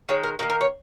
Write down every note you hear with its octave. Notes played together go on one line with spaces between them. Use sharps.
D#3 G#3 C#5
A#4
D#3 F#3 A#3 A#4
A#4
C#5